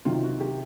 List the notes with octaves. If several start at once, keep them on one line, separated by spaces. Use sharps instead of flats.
C3 D#3 F#3 F4
F#4
G4